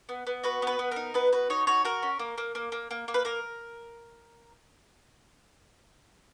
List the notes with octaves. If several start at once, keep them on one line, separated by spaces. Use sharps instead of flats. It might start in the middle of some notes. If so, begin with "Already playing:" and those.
B3
B3
F#4 B4
B3 B4
B3
D#4 A#4
B3 B4
F#4 B4
D#4 C#5
F#4 C#5
F#4 A#4
C#4
A#3
A#3
A#3
A#3
A#3
A#3
B4
A#3 A#4